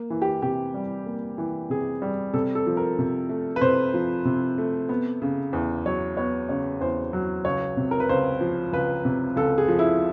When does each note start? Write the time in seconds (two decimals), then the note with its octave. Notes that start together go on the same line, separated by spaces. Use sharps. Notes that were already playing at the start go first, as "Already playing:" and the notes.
Already playing: A#3
0.10 E3
0.22 G4
0.42 C3 G4
0.74 G3
1.06 A#3
1.38 E3
1.70 C3 G#4
2.02 G3
2.34 C3 A4
2.55 A4
2.67 F3
2.77 A#4
2.99 C3
3.29 A3
3.56 B4
3.61 C3 C5
3.94 F3
4.25 C3
4.58 A3
4.89 B3
5.22 C#3
5.53 E2
5.86 F#3 C#5
6.17 B3 C#5
6.49 C#3 C#5
6.81 E2 C5
7.13 F#3
7.45 C#2 C#5
7.77 C3
7.91 A#4
8.00 B4
8.09 C#2 C5
8.41 F3
8.72 C#2 B4
9.05 C3
9.36 C#2 A4
9.58 G#4
9.68 F3
9.79 E4